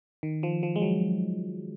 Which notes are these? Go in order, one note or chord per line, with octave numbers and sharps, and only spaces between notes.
D#3
F3
F3
G#3
F#3